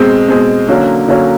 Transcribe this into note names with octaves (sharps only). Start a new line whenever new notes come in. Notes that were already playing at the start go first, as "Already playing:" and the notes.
Already playing: B2 G#3 C4
B2 G#3 C4
D3 F#3 A#3 C#4
D3 F#3 A#3 C#4